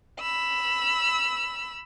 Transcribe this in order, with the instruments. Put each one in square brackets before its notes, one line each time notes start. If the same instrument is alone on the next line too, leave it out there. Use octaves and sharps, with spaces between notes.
[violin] B5 E6